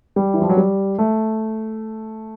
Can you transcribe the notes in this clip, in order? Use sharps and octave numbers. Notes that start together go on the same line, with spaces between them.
G3
E3
F3
F#3
G3
A3